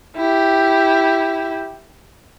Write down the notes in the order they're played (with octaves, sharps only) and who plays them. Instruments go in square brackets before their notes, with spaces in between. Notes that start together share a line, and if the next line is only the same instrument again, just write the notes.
[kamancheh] E4 G4